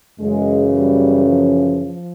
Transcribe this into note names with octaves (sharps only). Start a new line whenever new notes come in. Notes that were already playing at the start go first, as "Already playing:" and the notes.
F#2 C#3 E3 G#3
G3
F3
F3